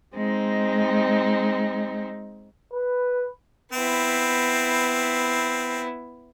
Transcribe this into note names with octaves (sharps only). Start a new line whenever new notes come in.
G#3 C4 D#4
B4
B3 C4 E4